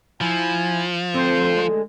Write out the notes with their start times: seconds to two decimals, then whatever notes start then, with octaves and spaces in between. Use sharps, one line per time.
0.21 F3 E4 G#5
1.14 D2 D3 C4 C5
1.57 G#3